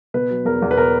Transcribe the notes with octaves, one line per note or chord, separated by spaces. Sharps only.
B2 B4
F#3
E2 A#4
E2
B4
B2 A#4